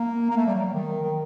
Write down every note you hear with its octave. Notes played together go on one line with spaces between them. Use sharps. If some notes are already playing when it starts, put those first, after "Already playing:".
Already playing: A#3
A#3
A3
G3
F#3
F#3
D#3
D#3